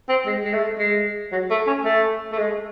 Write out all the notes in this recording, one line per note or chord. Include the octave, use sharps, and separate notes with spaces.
C4
G#3
G#3
A3
G#3
F#3
A3
C#4
A3
A3
G#3